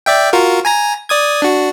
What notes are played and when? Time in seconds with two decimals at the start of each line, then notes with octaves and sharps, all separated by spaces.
0.06 D5 E5 G5
0.33 F4 F#4 A#4
0.65 G#5 A#5 A#6
1.09 D5 D#6 G#6
1.42 D4 F#4